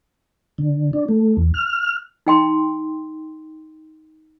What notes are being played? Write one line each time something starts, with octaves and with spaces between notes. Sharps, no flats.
D3
D4
A3
E2
F6
D#4 G5 C6